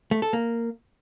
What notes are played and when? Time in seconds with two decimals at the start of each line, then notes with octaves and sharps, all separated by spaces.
0.11 A3
0.22 A4
0.33 A#3